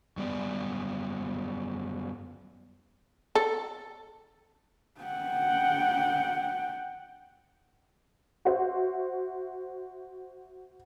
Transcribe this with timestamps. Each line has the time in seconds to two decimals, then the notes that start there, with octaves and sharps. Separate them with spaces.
0.17 F#2 G3 B3 D5
3.35 A4
5.01 F#5 G5
8.45 F#4 C5 E5